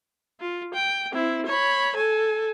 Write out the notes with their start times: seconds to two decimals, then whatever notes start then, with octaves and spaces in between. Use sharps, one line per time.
0.40 F4
0.74 G5
1.12 C4 E4
1.46 C#5 B5
1.96 A4 G#5